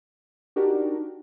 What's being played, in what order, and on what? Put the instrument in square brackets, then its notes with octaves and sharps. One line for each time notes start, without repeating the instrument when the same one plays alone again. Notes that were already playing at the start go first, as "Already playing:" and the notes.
[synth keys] D4 D#4 F#4 G4 A#4